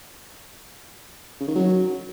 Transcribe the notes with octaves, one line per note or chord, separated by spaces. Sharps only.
C#3
D#3
F#3